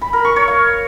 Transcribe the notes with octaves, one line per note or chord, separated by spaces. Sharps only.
B5
A#4
C#6
C#5
F5